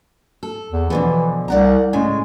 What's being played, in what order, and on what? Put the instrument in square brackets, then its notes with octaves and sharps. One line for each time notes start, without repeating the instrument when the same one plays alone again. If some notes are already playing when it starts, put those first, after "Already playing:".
[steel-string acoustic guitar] A4
[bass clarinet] E2
[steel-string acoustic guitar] B2 D3 F3 [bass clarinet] E3
[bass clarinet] C2 [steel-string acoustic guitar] D5 F#5 A#5
[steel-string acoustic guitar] A2 C#3 G#5 [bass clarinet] G#3